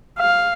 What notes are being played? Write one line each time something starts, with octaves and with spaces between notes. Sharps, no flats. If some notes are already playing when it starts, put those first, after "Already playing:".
F5